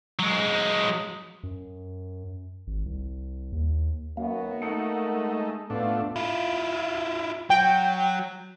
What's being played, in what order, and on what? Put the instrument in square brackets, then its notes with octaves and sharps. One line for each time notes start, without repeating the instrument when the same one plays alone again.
[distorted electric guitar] F#3 G#3
[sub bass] F#2
G#1
C2
D#2
[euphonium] F#2 [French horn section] D#3 B3 F#4 [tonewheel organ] A#3
[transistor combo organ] A3 D#4 [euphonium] A#3 [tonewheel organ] F#5
[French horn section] G#3
[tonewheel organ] A2 [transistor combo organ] A3 D4 [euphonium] B3 [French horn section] F4
[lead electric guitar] E4 F4
[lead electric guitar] F#3 F#4 [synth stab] G5